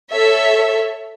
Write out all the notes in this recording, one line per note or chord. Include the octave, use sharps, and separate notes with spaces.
A4 C#5 E5